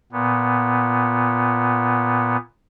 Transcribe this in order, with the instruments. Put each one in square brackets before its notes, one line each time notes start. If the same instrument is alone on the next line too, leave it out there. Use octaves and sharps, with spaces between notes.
[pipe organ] A#2 B3